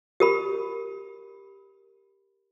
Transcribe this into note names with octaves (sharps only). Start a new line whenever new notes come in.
G4 A#4 B5